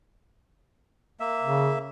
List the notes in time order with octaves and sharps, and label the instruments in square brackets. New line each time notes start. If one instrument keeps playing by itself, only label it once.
[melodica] A#3 E5
[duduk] C#3